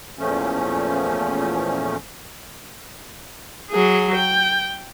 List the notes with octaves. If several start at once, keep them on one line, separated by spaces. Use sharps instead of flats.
E2 A#2 F3 A3 C#4
F#3 G#4
G5